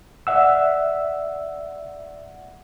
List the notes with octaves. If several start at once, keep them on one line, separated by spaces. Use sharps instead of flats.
D5 E5 F#5 E6